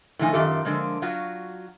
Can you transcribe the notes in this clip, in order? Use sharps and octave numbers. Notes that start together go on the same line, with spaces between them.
A2 D#3 F3 A3 D#4 G#5
F#2 D#3 F4 G4 A4 E5
D3 F3 G#3 A#3
F#3 F4 F#4